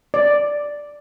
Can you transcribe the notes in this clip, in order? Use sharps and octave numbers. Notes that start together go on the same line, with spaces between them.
D5